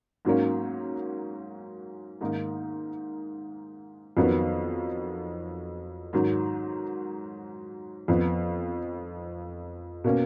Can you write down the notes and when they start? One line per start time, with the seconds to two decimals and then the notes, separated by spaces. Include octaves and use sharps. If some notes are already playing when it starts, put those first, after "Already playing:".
0.25 G#2 F#3 A#3 C#4
2.21 G#2 D#3 A#3 D#4
4.17 F2 D#3 F#3 B3
6.13 G#2 D#3 F#3
8.08 F2 F3 B3
10.04 B2 A#3 C#4